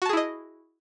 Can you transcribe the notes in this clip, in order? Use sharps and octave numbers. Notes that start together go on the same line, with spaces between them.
E4 F#4 G#4 D#5 A5